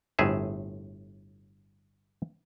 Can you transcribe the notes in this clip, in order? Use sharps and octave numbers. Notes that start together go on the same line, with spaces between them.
G1 A2 C4 G#4 E5